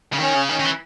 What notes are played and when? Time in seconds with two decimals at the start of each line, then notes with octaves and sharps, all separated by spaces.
0.13 C#3
0.20 D#3 C#4
0.35 C#3
0.49 D#3 C#4
0.59 D#3
0.65 E3